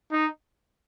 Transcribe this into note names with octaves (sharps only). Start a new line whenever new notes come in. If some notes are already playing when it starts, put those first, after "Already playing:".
D#4